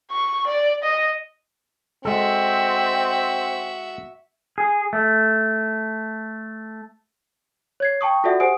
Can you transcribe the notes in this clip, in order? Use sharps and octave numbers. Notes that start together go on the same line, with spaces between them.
C#6
D5
D#5
G#3 C4 F#4 A4 E5
G#4
A3
C#5 G#6 C7
G5 A5 C#6 D#6
F4 F#4 A4 D5 E5 F#5
G4 C5 F#5 G#5 D#6 D7